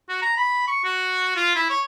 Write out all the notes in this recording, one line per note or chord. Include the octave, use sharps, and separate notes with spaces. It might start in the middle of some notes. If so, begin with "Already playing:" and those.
F#4
A#5
B5
C#6
F#4
F4
E4
C#5